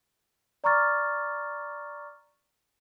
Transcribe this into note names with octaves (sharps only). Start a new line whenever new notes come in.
D5 A#5 C#6 D6 F6 A6